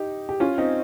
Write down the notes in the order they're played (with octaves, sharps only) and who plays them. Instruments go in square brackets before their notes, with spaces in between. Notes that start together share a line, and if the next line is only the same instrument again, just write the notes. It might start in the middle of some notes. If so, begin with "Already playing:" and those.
Already playing: [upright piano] D#4 G4
G4
C#4 F4
C4 D#4